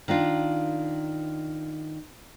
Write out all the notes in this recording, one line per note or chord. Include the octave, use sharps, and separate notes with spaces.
D#3 A#3 D4 F4